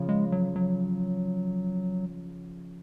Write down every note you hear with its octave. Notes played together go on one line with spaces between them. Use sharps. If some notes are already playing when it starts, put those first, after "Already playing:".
Already playing: C#3 F3
G#3
F#3
F#3